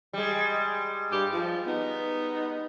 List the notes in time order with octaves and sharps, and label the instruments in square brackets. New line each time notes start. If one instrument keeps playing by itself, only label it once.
[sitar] G3 G#3
[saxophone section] G2 G4
F3
B3 D#4